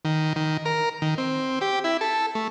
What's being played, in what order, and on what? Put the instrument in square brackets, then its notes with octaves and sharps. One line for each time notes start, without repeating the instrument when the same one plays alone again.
[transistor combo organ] D#3
D#3
A#4
D#3
C4
G4
E4
A4
A3